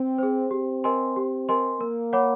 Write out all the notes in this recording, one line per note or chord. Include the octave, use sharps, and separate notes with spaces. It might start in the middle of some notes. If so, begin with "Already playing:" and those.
Already playing: C4
G#4 C5
C4 G4
A#4 D#5 G#5 C6
G4
A#4 D#5 G#5 C6
A#3 A#4
C#5 F#5 B5 D6